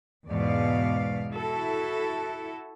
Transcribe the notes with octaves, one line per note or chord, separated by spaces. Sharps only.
E2 G#2 B2 D5 F5
E4 F#4 A4